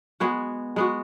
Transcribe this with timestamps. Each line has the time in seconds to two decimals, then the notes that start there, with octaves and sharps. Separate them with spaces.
0.20 G#3 B3 F#4
0.76 G#3 B3 F#4